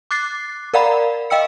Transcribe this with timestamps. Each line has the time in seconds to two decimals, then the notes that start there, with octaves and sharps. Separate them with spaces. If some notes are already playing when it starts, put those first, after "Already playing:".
0.11 D6 F#6 A6 C7
0.74 A#4 D5 F5 F#5 A#5 B5
1.30 D#5 F5 G5 E6 C#7